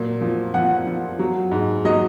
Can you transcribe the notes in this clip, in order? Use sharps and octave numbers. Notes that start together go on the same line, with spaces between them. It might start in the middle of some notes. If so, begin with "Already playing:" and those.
Already playing: A#2 F#3
F3
F3 F#5
F3
F#3
G#2
F#3 D#5